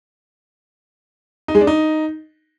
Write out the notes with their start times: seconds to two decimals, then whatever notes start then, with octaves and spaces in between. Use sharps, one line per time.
1.48 D#4
1.55 G#3
1.61 D4
1.67 D#4